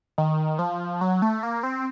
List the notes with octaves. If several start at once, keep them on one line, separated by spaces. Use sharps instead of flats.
D#3
F3
F#3
A3
A#3
C4